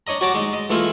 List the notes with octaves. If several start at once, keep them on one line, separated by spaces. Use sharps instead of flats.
D4 C#5 D#5 A#5
F#4 C#5 A5 A#5 C#6 D6
G#3 D#4
D#5
E3 G#3 A3 E4 F4